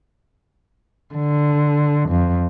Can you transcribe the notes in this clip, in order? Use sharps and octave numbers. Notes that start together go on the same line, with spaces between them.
D3
F2